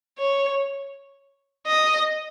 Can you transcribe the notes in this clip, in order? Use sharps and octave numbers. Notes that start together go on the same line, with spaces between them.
C#5
D#5